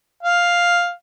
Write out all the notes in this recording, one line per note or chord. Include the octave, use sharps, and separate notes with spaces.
F5